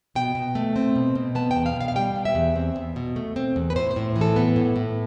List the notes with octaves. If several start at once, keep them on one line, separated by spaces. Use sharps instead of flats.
B2 G5
B2
A3
C4
B2
B2
B3 A5
G5
E2
F5
B2 F5
F5
G3 G5
B3
E5
E2
C4
E2
B2
A3
C4
E2
B4
A2 C5
C5
A2
E3
A4
B3
A2
A2